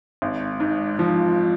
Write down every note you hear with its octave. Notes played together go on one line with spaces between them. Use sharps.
G#1
G#2
F3